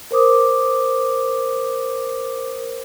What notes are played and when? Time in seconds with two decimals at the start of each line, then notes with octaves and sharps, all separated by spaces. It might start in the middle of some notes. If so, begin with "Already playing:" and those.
0.11 A#4 C5 D6 D#6